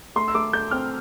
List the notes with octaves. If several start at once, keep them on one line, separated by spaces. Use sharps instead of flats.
A3 C6
E6
A3 D6
A3 G6
C4 F6